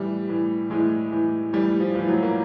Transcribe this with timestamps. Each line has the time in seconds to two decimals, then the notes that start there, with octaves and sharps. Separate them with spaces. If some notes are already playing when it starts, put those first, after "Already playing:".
Already playing: A2 E3 G3
0.29 A2 E3
0.70 A2 E3 G#3
1.12 A2 E3
1.53 A2 E3 G3
1.80 F3
1.95 A2 E3 F3
2.08 F#3
2.23 A#3